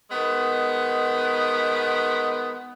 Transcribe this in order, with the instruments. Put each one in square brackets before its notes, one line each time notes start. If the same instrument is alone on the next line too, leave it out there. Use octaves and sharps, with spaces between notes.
[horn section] D#3 G#3 B3